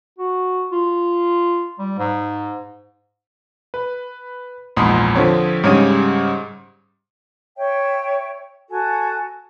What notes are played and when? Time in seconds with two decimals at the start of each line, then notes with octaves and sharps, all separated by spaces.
0.18 F#4
0.72 F4
1.79 G3
1.98 G#2
3.74 B4
4.77 A#1 E2 G#2 B5 C6 D#6
5.15 D3 F3 C4 C#5
5.63 G#2 C#3 G3 C#5 D#6 D#7
7.57 C#5 E5 G5
8.69 F#4 A4 G#5